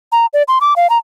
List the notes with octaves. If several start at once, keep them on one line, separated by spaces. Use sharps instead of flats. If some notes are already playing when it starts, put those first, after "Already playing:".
A#5
D5
C6
D6
F5
A#5